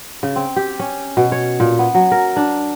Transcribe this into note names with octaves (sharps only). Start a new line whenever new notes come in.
C#3
C4
G4
C#4
B2
C#5
A#2
B3
F#3
A#4
D4